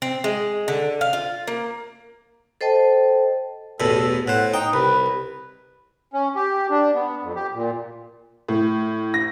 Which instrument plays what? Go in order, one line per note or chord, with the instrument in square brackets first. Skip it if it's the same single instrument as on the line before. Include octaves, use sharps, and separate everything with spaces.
[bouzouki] C4
G#3
D3
F5
F4
A#3
[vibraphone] A4 C5 D#5 G5 A5
[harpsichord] A1 E2 B2 [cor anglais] A4
[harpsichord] A2 C5 [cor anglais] F#5
[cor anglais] D#4 [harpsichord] G5
[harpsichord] C2 [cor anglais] B4
[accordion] C#4
G4
D4
B3
F2
G4
A#2
[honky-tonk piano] A2
A#6